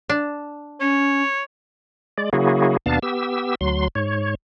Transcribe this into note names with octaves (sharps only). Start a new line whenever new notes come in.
D4
C#4 C#5
G#3 D5
C#3 F#3 A#3 E4 F#4 G#4
D#2 B2 B3 D4 F5 A5
B3 G4 E6
D2 F#3 C6
G#2 C#5